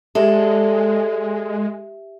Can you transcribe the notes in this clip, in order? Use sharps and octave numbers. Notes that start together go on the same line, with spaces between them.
G#3 G4 A4 D5 E5